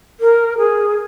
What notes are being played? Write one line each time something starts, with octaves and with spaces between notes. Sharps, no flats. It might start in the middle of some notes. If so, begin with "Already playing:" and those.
A#4
G#4